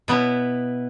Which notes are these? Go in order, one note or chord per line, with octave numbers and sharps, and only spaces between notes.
B2 B3 E4